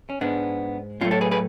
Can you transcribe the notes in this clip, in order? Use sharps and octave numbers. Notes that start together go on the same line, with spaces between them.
C#4
G#2 G#3 B3 D4
A2 F#3 A3 C#4 F4
A4 C#5
G#4 B4
G#4 B4